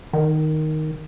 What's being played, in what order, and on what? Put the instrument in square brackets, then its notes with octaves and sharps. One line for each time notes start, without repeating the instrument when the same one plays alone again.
[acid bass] D#3